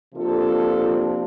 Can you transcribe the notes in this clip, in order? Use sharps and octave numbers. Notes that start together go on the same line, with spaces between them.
C3 F3 A#3 D4 F4 A4